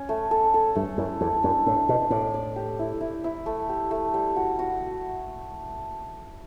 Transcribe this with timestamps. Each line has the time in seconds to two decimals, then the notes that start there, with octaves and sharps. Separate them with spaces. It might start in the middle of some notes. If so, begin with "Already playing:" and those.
Already playing: C#4 C#5
0.09 A3
0.31 A4
0.54 A4
0.75 G2 A3
0.98 F#2 E4
1.21 E2 A4
1.43 F#2 D4
1.66 A2 D4
1.89 B2 D4
2.10 A2 D5
2.34 D5
2.56 G4
2.79 E4
3.01 E4
3.24 E4
3.46 A3
3.69 G4
3.91 A3
4.14 G3
4.36 F#4
4.59 F#4